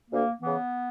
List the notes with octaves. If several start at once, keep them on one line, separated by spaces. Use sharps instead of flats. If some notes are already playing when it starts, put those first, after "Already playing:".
D2 A#3
C#3 E3 B3